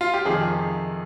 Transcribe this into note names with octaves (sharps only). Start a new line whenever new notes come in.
F4
G4
F2 C3 D#3 G#4